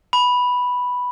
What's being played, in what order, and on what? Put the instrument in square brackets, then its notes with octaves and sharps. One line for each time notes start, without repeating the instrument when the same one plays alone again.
[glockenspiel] B5